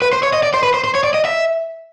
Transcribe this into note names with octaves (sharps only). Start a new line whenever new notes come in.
B4
C5
C#5
D#5
D5
C5
B4
C5
C5
C#5
D5
D#5
E5